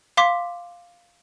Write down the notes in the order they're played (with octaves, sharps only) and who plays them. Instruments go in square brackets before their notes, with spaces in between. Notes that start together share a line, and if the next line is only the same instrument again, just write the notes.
[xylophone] F5 C6 D6 B6